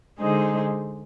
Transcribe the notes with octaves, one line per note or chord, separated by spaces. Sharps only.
D3 G#3 D#4 G#4 C5